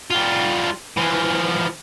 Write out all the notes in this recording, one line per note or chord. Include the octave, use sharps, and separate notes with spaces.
G3 F4
E3 F3